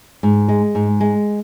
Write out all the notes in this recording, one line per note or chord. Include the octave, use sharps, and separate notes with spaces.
G#2
G#3
G#2
G#3